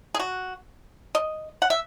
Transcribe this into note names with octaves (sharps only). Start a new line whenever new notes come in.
G#4
F#4
D#5
F#5
E5